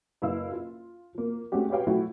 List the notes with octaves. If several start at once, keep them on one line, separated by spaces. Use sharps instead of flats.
F#1 E4 B4 F5 E6
F4
F3 A#3
G#3 A3 C4 C#4 F#4 G4
F#4 G4 B4 C#5 F5 G5
F3 F#3 A3 E4 F#4